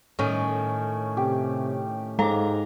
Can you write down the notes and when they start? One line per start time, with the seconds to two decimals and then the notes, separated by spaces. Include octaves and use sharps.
0.19 A2 D#3 C#4
1.17 C3 G4
2.19 G#2 G#3 A4 F5 A#5 D6